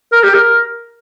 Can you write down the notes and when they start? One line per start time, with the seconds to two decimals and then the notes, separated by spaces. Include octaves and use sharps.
0.12 A#4
0.24 G4
0.34 A#4